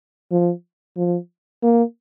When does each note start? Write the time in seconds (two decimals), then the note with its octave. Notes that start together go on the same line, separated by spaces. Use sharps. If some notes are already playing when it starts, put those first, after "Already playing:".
0.31 F3
0.97 F3
1.63 A#3